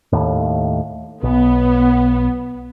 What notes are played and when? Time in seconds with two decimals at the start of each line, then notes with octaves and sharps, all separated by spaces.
0.12 D#2 A2
1.23 B1 B3